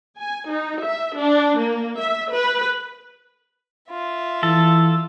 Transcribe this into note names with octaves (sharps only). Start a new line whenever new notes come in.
G#5
D#4
E5
D4
A#3
E5
B4
F4 E5
E3 A4